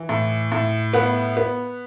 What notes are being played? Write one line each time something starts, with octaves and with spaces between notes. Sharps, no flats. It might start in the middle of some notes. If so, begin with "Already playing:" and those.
Already playing: E3
A2
A2
B3 F#5
B3